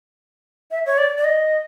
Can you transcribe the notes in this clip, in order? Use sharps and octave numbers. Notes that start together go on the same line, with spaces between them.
E5
C#5
D5
D5
D#5